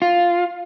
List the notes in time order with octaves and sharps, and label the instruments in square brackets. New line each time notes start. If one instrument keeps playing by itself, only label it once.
[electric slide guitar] F4